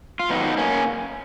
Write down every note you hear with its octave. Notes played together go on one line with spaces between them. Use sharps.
F4
G#2 D#3 F#3 B3 D#4
A#3 C#4